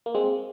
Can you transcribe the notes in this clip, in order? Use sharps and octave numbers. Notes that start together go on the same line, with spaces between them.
A#3
G#3 C4